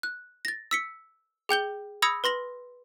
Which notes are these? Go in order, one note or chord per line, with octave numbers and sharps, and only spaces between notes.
F#6
A6 A#6
E6 B6 C#7
G#4 G5 G6 G7
B5 D#6 E6 G#6 A#6 C#7
B4 C6 A#6 F#7